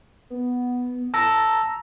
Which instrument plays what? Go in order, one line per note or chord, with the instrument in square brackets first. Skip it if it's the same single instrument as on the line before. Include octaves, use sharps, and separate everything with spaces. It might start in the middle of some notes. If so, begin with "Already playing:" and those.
[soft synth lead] B3
[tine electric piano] A5 E6 A#6 [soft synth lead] A#5